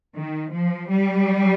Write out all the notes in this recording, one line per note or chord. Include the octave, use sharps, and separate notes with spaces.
D#3
F3
G3